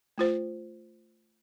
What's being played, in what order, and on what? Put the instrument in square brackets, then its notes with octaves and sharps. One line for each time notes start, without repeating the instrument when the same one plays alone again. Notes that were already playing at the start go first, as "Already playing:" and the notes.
[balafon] A3 F4 C5